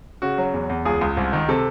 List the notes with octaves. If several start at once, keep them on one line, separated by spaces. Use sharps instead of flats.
C#3 F#4
F#3
E2
E2
C#2 G#4
C#2
C2
D#3
C3 A4